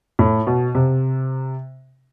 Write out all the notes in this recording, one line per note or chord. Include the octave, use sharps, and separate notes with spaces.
A2
B2
C3